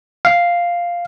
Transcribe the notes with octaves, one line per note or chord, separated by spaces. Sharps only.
F5